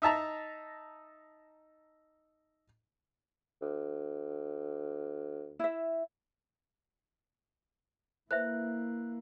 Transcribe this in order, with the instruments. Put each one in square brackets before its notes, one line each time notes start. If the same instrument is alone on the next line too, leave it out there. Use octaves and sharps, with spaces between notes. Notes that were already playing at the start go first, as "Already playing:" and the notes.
[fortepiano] D#4 E5 A5 A#5
[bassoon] D2
[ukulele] E4 E5
[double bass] A#3 E4 [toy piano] B4 C5 E5 [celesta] F#6